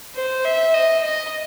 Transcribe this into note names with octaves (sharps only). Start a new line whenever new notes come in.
C5
E5
D#5
D#5